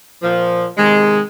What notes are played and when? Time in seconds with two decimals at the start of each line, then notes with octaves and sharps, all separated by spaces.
0.22 A#2 F3
0.77 C3 D#3 G#3